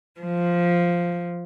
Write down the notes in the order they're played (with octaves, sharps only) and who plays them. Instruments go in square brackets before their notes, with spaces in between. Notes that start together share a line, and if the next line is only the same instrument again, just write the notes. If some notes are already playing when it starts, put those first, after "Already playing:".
[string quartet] F3